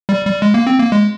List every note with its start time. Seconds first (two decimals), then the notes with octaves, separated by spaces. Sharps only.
0.09 G3
0.25 G3
0.42 G#3
0.54 A#3
0.67 C4
0.79 A#3
0.92 G#3